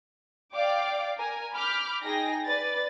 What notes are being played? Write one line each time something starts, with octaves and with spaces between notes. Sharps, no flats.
D5 F5 G5 D6
A#4 G#5
B5 D6 F6 G6 B6
D#4 G#4 G5 A#6
B4 D5 A6